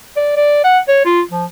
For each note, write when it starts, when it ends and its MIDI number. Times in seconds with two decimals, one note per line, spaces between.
0.16 0.34 74
0.36 0.62 74
0.64 0.79 78
0.88 1.03 73
1.05 1.22 65
1.31 1.44 53